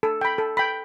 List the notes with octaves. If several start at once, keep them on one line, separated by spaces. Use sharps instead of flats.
A4
G5 B5
A4
G5 B5